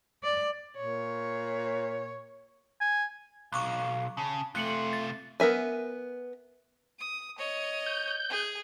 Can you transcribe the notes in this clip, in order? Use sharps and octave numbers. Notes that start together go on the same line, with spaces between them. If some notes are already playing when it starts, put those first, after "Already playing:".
D5
A#2 C#5
G#5
B1 F5 C#6 D6 F#6
C#3 A5
C3 A3 F4 F#6 C#7 F#7
A6
B3 A#4 E5 G#5
D#6
C#5 D#5
G6
G#4